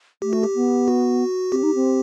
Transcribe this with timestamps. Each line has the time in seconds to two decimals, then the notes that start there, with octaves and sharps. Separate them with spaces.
0.22 A3 G4
0.33 F#4
0.43 G4
0.55 B3
0.88 F#4
1.52 C4 G4
1.63 D#4
1.75 C4